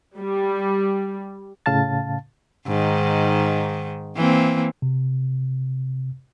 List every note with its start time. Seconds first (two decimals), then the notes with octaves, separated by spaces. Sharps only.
0.17 G3
1.66 A2 C#3 F5 A5 A6
2.67 G#2 D#3
4.16 E3 A#3 C4
4.82 C3